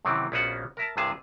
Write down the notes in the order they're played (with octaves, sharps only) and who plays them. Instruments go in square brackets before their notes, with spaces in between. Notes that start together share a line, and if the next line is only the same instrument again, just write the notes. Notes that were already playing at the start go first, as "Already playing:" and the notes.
[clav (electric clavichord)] F#2 C3 D#3 E3 C4
A#1 B3 C#4 F4 F#4 F#5
A#4 E5 A5
C2 G2 C3 G#4 G#5 A5